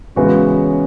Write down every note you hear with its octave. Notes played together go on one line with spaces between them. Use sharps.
C#3 E3 G#3 B3 C#4 F#4